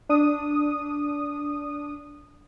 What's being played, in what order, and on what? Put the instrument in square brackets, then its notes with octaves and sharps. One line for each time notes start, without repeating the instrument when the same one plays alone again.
[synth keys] D4 D#6